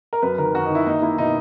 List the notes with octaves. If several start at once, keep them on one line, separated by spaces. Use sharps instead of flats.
A#4
F#2 B4
D#3 A#4
F#2 F#4
D#4
D#3 E4
A#3 D#4
A#3 E4
B2 D#4